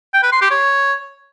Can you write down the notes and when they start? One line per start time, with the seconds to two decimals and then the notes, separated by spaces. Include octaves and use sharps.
0.14 G5
0.23 B4
0.32 C6
0.41 G4
0.51 C#5